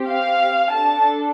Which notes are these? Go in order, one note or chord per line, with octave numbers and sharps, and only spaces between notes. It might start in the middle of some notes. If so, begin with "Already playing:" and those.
Already playing: C4 G4
F5
D4 A4 A5